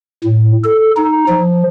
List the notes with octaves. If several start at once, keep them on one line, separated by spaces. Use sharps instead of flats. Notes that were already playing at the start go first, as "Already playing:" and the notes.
A2
A4
D#4
F3